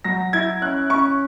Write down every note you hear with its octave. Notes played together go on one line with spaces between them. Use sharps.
F#3 A#6
E4 G#6
C#4 F#6
C#4 C#6